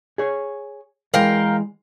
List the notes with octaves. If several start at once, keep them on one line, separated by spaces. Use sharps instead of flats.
G#4 C#5
E3 G#3 A#4 F5 G5